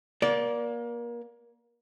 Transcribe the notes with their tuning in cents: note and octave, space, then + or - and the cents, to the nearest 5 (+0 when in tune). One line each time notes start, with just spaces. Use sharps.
A#3 +30 D5 -15